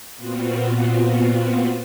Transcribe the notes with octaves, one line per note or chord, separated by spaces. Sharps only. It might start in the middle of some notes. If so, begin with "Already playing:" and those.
A#2 B3 C4 F4 F#4